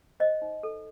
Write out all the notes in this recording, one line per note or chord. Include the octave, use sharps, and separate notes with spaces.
C5 D#5
D#4
A4